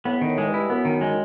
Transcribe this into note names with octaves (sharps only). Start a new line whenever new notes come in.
A2 B3
G#2 D#3
A2
G#3
G2
E4
F#2 B3
D#3
G#3